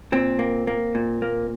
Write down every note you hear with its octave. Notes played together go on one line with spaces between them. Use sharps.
A#2 C4
A#3
A#3
A#2
A#3